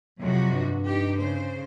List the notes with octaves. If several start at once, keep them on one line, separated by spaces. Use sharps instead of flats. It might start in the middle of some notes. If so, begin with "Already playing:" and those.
F2 C3 F#3 F#4
G2
D#4 G4
C#3 C5